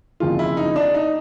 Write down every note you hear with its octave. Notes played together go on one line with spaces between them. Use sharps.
F#1 F2 C#3 F3 G#3 F4
E4
D#4
D4
D#4